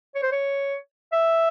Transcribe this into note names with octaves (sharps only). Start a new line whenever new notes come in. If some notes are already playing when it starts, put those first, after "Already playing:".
C#5
C5
C#5
E5